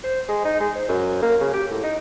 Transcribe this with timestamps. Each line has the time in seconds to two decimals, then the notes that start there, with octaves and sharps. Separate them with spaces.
0.04 C5
0.28 G#3
0.45 D#4
0.60 G#3
0.75 C5
0.89 F#2
1.22 A#3
1.41 C#3
1.53 G4
1.71 A2
1.83 D#4